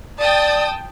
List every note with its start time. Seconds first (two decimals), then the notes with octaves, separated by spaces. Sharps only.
0.19 D5 G5 A5 D#6